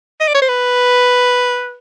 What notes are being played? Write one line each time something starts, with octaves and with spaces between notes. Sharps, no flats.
D#5
D5
C#5
C5
B4